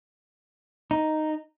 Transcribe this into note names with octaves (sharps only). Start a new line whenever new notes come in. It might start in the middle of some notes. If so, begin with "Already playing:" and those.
D#4